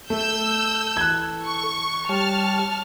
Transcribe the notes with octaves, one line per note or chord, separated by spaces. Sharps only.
A3 A4 E6 G6
E3 F#6 G#6
C#6
G3 G4 C#5 A5 C#6 F6